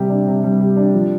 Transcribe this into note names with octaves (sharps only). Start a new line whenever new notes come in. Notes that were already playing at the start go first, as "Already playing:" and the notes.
Already playing: C3 G3 G4
D4
C3
G3
G4
D4
F3